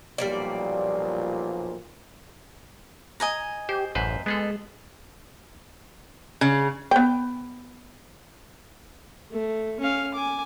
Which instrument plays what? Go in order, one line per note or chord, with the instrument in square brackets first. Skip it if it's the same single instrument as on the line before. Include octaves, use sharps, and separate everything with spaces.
[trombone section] B1 A#2 F3 [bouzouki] G3 A#3 D5
[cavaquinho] D#5 G#5 A#5
[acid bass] G4 [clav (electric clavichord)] C5
[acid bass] A1 [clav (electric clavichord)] F#2 B4 C5
[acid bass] G#3 [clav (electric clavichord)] B3 G#4 A4
[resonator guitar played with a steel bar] C#3
[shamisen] B3 G5
[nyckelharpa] A3
C#4 F5
G#5 D6